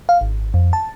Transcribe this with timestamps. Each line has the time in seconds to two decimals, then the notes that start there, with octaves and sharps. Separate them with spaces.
0.09 F5
0.21 G#1
0.54 F2
0.73 A5